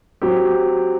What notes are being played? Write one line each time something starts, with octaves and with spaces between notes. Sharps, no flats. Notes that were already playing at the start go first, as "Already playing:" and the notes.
F#3 C4 G4